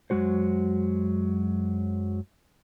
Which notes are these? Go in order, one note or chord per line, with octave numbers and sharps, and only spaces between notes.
F#2 F#3 G#3 F#4 C5